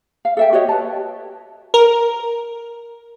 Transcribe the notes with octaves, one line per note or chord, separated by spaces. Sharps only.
F5
A4 E5 G5
F#4 G4 C#5 D#5
B4 A5
A#4